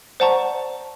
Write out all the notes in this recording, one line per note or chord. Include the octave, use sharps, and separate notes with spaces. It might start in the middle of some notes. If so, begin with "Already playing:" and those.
C5 D5 F#5 A5 A#5 C#6